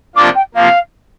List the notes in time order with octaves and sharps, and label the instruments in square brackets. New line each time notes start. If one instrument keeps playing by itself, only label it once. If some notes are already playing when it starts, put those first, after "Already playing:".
[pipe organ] C3 F3 A#3 D4 F4 [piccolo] D6
[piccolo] G5
[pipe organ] C3 F3 A#3 [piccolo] F5